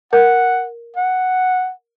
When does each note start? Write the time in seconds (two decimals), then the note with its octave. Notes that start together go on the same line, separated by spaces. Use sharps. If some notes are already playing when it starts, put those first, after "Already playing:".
0.13 A#4 F#5
0.97 F#5